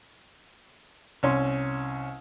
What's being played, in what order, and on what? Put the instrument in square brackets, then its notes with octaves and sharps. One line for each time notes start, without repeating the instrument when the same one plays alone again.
[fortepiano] C2 C#4 C6